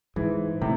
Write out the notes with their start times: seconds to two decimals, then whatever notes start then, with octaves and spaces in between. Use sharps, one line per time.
0.16 G#2 E3
0.61 A2 C3